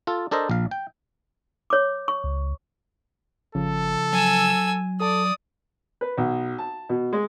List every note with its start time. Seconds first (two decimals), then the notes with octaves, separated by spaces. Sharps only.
0.07 F4 A4
0.31 D4 A4 A#4 C5 D#5
0.50 A#1 F5
0.71 G5
1.70 C#5 D6
2.08 C#6
2.24 C#2
3.55 G#1 C#3 F3 A4
4.12 F#3 G#5 E6
5.00 A4 D5 A5 D#6
6.01 B4
6.18 B1
6.58 A5
6.89 B2
7.13 G#3